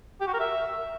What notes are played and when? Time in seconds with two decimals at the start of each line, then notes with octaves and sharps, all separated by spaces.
0.21 G4
0.27 F#4
0.34 A#4
0.40 E5